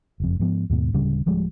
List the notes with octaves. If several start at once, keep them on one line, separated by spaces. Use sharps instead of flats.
F#1 F2
G#2 F3 B3
D#2 G#2 B2
D1 C#3 G3
D1 F3 G3 G#3